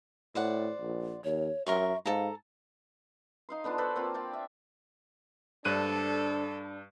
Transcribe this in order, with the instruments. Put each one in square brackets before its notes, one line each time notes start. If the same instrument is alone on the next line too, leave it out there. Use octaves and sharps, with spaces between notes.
[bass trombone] A2 [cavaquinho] C5 D5 F#5
[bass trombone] A#1
[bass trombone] D#2 [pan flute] C#5
[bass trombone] F#2 [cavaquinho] A#4 C6 C#6 [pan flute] E5
[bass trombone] G#2 [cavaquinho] A4 A#5 [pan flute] F5
[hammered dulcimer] D#4 F5 C6
D3 B3 D4 F4
F#4 A4 B4 C5
A#3 C4 F4
D5 G5 A5
E5
[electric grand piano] G2 F#6 D#7 [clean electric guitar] D3 C5 D5 [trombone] D4 [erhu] A4